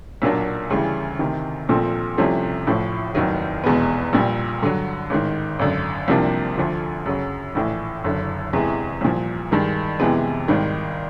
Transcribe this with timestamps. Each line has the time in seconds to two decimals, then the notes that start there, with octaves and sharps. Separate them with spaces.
0.22 B1 A#2 F#3 A#3 D4
0.70 D2 C#3 E3 G3
1.19 D2 C3 D#3
1.69 A#1 A#2 F3 A3 C4
2.17 C2 C3 F3 A3 C#4
2.67 A1 A2 F3
3.15 F1 D#2 D#3 F#3
3.64 F1 E2 B2 G#3 B3
4.13 A#1 A#2 G3
4.62 G2 D3 F#3
5.10 A1 G#2 D#3
5.59 G#1 F#2 D3
6.08 C2 C3 F3 A#3 D4
6.57 D2 D3 F3 A3 D4
7.06 F#2 C#3 F#3
7.55 A#1 A2 E3
8.04 F#1 F#2 D3
8.53 E2 C3 E3 G#3
9.01 C2 A#2 F3
9.51 G2 D#3 G#3
10.00 F2 C3 E3 G#3 B3
10.48 G#1 G#2 D#3 G3